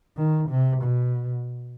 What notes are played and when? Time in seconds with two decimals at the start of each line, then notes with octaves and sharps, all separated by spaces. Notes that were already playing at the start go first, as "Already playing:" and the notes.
0.17 D#3
0.50 C3
0.83 B2